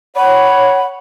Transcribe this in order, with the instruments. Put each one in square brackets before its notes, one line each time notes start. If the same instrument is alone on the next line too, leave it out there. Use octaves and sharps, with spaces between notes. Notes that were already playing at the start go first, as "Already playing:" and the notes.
[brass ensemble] C#5 [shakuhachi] F#5 [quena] B5